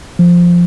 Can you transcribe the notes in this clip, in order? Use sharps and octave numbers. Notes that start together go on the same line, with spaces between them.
F3